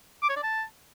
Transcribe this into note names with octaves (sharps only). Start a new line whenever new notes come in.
D6
C#5
D5
A5